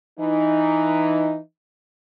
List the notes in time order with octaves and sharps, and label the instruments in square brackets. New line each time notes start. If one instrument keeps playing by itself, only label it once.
[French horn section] E3 D#4